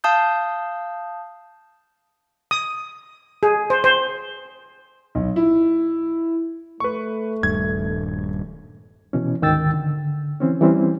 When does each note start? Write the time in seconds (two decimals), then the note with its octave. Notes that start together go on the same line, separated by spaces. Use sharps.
0.04 F5 A5 D#6 G6
2.51 D#6
3.43 G#4
3.70 C5
3.84 C5
5.15 B1
5.36 E4
6.80 A3 B4 C#6
7.43 D#1 G2 G#6
9.13 B2 E3 C#4
9.41 D2 G#2 D#3 G5 E6 A6
9.74 D3
10.40 E3 C4 C#4
10.61 E3 G3 C4 C#4